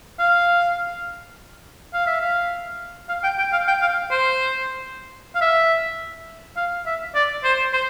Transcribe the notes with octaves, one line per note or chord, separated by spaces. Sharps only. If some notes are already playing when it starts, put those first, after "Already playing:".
F5
F5
E5
F5
F5
G5
G5
F5
G5
F5
C5
F5
E5
F5
E5
D5
C5
C5